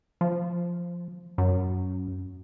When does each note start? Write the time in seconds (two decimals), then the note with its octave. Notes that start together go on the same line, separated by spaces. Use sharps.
0.21 F3
1.38 F#2